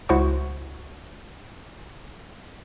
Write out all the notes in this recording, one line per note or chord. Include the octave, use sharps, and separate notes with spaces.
C#2 E4 F#4 C5 F#5 C#6